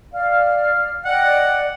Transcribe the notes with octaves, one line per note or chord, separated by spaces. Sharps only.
D5 F5 F6
D5 D#5 F#5 G5